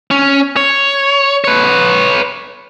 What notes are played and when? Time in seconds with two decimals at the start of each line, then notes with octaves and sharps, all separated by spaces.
0.11 C#4
0.56 C#5
1.44 B4 C#5